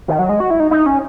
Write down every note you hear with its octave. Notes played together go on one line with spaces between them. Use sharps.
D#3
F#3
G#3
F#4
E4
D#4
D#4
C#4